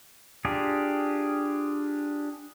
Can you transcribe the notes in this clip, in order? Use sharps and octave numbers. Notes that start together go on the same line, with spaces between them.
D4 F4 G4 G#4